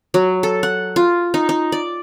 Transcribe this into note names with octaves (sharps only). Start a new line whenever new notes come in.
F#3
A4
F#5
F4
D#4
D#4
D5